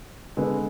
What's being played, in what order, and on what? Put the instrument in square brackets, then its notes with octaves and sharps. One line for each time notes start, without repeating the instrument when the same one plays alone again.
[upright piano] D3 G#3 B3